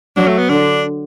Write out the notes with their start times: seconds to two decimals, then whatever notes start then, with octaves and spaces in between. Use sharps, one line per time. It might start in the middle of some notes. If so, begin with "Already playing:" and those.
0.16 F#3 D4
0.27 A3
0.38 B3
0.49 D3 D4